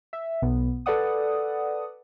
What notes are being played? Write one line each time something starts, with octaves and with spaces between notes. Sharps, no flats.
E5
B1 B2 B3
A4 B4 D5 F#5 D#6